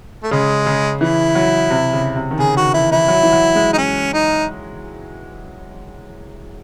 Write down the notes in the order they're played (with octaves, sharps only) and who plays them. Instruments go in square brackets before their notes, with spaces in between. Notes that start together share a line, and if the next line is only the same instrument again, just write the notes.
[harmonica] A3
[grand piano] C#3 [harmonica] G#3
[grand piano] C#3
[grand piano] E3 [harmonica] E4
[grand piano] F#3
C3
C#3
C3
D#3
[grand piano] C#3 [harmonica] G#4
[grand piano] D#3 [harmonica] F#4
[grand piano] E3 [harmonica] E4
[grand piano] E3 [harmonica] E4
[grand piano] F#3
E3
F#3
G#3
[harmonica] D#4
C#4
D#4